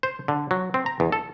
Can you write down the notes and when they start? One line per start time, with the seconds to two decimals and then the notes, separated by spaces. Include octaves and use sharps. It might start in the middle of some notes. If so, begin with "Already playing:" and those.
0.03 C5
0.28 D3
0.51 F#3
0.74 C4
0.86 A#5
1.00 E2
1.12 A4